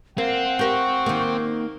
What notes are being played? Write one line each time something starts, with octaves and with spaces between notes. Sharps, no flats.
A#3 C4 F5 F#5
G4 A#4 C#6
D#3 A#3